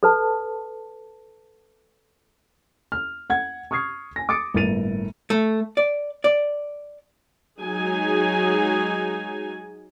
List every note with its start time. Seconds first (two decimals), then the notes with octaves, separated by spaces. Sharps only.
0.03 A4 B4 A5
2.92 F6
3.30 F#5 G#6
3.71 C#6 D#6 F6 G#6 C7
4.16 G#5 A#6
4.29 D6 D#6 A6 C#7 D7
4.54 G1 A2 A#3 A6 D#7 F7
5.30 A3
5.77 D5
6.24 D5
7.60 F#3 G#3 D#4 G#4 G#5